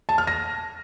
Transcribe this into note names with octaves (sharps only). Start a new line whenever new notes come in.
A5
F6
A#6